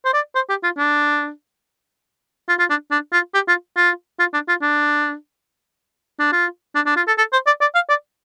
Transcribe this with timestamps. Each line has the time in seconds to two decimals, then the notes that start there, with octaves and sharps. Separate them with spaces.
0.05 C5
0.14 D5
0.35 C5
0.49 G4
0.64 F4
0.78 D4
2.49 F4
2.59 F4
2.70 D4
2.91 D4
3.13 F4
3.34 G4
3.48 F4
3.77 F4
4.19 F4
4.34 D4
4.48 F4
4.62 D4
6.20 D4
6.33 F4
6.75 D4
6.86 D4
6.97 F4
7.08 A4
7.18 A4
7.33 C5
7.47 D5
7.61 D5
7.75 F5
7.90 D5